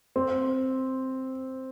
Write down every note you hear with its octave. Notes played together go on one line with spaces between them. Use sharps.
C4